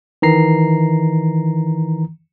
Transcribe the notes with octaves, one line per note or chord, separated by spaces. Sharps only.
D#3 E3 A#5 C7